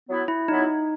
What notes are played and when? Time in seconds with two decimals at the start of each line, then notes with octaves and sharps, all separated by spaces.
0.08 F#3 B3 E4
0.28 E4
0.48 F#3 B3 D#4 E4